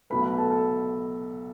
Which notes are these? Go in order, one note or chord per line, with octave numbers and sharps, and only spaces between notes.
B1 B2 A3 B4 B5
B4 B5
A4 A5
A4 A5